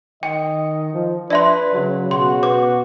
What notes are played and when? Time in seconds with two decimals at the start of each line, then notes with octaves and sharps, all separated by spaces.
0.23 D#3 D#5 G5
0.94 F3
1.30 D4 B4 D5 E5 C6
1.74 C#3 F#3
2.11 B2 F#4 C6
2.43 B2 B4 D6